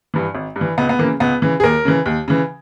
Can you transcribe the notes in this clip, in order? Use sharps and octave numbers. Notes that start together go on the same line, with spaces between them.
G2 E3
G#1
G2
E3
C#2 B3
B3
C#3 E3 A#3
C#2 B3
C#3 E3
G#4
D#2 A#4
C#3 E3
D#2
C#3 E3